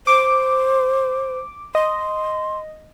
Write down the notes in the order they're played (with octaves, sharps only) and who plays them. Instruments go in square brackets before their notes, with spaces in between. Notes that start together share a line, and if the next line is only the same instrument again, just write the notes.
[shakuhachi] C5 [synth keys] D6
[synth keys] D#5 [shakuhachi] C6